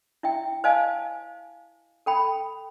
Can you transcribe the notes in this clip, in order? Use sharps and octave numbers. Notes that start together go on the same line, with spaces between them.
E4 E5 G5
C5 D#5 F5 G#5 A5
A4 G5 B5